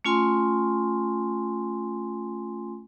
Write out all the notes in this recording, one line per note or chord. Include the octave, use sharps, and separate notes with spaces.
A3 C#4 F4 G#5 C6